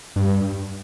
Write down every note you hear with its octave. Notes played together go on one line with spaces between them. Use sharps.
G2